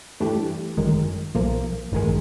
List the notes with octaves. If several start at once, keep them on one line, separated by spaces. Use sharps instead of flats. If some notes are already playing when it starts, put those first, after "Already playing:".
G2 E3 A3 D4 G4
G#1 F#2 D#3 G#3
B1 A#2 F3 A#3
A1 G2 D#3 G#3